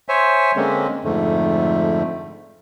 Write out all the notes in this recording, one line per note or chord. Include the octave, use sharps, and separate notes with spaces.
C5 C#5 E5 G#5
D3 G#3 A#3 C4 C#4
F2 G#2 D3 A3